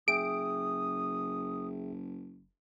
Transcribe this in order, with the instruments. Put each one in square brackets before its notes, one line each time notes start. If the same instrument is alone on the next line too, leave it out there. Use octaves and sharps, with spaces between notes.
[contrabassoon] F#1 [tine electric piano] G#4 E5 G5 [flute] D#6 [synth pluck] D7